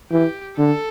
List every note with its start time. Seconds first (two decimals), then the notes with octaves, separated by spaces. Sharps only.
0.11 E3 G4
0.58 D3 A4